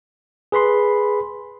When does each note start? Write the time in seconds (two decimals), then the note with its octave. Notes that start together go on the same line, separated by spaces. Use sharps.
0.52 G#4 B4 B5 C6